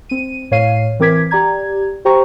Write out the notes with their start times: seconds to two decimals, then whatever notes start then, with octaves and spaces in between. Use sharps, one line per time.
0.09 C4 D#7
0.51 A2 C#5 F5 C7 D#7
0.99 E3 C4 A#4 D6 G#6 B6
1.31 G4 D5 A#5 G#6
2.05 G4 C5 G5 A#5 C#6